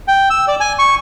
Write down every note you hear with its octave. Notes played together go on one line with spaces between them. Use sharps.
G5
E6
D5
G#5
C#6